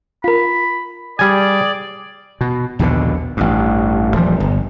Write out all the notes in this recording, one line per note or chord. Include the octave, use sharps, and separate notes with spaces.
F4 A#4 B5
G3 G#4 D5 G#5
B2
A#1 D#2 B2 D3
A1 G2
D#1 F3 G3
G1